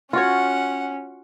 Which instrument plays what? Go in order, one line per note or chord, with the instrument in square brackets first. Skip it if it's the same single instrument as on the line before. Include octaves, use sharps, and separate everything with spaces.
[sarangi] C#4 [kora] F4 F#4 C#5 [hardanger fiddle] F#5